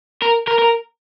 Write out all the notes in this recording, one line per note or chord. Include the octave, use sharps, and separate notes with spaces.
A#4
A#4
A#4